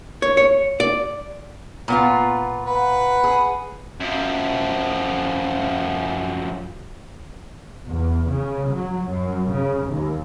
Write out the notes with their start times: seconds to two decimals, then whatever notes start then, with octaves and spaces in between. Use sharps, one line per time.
0.22 C#5
0.37 C#5
0.80 D5
1.88 A#2 B3 F4
2.66 B4 F#5
3.24 G#4
4.00 F#2 F3
7.87 E2
8.30 C#3
8.70 F#3
9.09 F#2
9.53 C#3
9.88 D#2